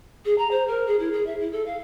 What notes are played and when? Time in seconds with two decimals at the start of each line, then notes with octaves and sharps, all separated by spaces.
0.25 G#4
0.38 A#5
0.51 C5
0.68 A#4
0.87 G#4
0.99 E4
1.12 G#4
1.26 E5
1.39 E4
1.52 A4
1.66 F5